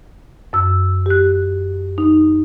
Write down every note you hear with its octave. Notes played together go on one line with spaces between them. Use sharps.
F#2 E6
G4 F#6
D#4